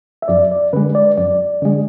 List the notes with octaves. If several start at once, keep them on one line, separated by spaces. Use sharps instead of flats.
E5
F#2 D5
D5
D3 G#3 B4
D5
F#2 D5
D3 G#3